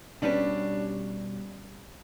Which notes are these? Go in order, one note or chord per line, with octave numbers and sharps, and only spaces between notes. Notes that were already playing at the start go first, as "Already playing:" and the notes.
B2 G3 C#4 D4 G4 B4